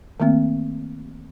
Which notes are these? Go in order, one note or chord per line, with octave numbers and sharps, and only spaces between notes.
D#3 A3 A#3 C4